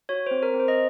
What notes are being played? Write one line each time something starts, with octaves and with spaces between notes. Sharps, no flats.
F#4 C#5
C5
C4
A#4
C4
C5
D#5